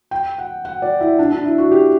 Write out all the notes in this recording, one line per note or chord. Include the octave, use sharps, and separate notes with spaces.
G5
F#5
F#5
D5
E4
D4
D4
E4
F#4
G4